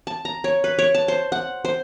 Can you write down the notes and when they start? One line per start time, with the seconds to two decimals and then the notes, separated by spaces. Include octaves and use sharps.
0.07 A5
0.25 A#5
0.44 C#5
0.64 B4
0.79 C#5
0.95 A5
1.08 C5
1.32 F#5
1.65 C5